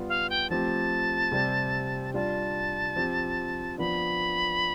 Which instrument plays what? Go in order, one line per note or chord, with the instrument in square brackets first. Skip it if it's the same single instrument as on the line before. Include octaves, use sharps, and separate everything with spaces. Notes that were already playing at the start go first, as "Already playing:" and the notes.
Already playing: [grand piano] G3 B3 F4
[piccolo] F5
G5
[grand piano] F3 A3 C4 G4 [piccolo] A5
[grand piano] C3 G3 C4 G4
[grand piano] G3 D4 F4 [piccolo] A5
[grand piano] F3 C4 G4
[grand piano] F3 B3 D4 [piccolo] B5